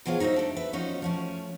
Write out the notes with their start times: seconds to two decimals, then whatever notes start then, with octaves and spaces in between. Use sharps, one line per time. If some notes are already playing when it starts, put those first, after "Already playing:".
0.06 B2 F3 F#3 F4 G#4 F5
0.20 D#4 F#4 B4 C5 E5
0.36 A3 D4
0.57 B4 E5
0.73 D#3 F3 C#4 D#4 F#4 C#5
1.02 F3 A3 C#4